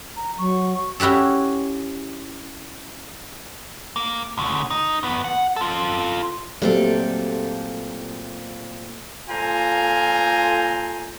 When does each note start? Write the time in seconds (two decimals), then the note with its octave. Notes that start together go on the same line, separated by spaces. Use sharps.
0.16 A#5
0.38 F#3 C#6
1.00 C#4 E4 F#4 G4 A4
3.96 A#3
4.38 D2 C#3
4.70 D#4
5.03 E2 B3
5.24 F#5
5.56 F4 A4
6.62 A#2 F#3 G3 A3 C4 A4
9.29 A#2 F4 A4 C5 G#5 A#5